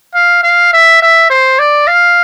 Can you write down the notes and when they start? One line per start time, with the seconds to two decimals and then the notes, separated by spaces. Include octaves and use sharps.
0.15 F5
0.44 F5
0.73 E5
1.02 E5
1.30 C5
1.59 D5
1.88 F5